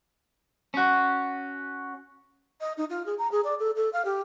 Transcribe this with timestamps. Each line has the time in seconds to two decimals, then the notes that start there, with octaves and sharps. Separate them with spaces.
0.74 C#4 F#4
2.61 D#5
2.77 D#4
2.90 F4
3.06 G#4
3.18 A#5
3.31 G#4
3.44 D5
3.59 A4
3.76 A4
3.93 F5
4.05 G4